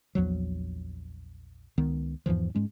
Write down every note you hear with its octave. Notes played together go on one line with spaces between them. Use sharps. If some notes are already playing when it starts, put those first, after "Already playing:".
A#1 E2 F3 F#3
C#2 D#3 B3
E2 G#2 E3 F3
G#2 G#3 C#4